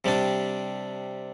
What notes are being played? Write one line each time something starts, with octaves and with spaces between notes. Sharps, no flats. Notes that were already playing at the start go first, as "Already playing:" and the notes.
C3 G3 D4